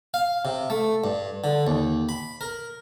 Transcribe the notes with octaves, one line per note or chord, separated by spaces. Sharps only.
F5
C3
A3
G2
D3
D#2
B5
A#4